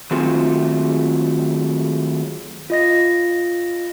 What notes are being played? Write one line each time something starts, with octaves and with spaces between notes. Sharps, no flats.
D#3 F#3 G#3 A3 C4 F4
F4 D#5 A#6